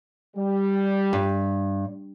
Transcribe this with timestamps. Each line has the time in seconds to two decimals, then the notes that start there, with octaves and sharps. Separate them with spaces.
0.37 G3
1.13 G2